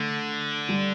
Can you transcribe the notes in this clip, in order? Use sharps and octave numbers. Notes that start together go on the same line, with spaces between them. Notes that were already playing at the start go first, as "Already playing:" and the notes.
Already playing: D3 A3
G3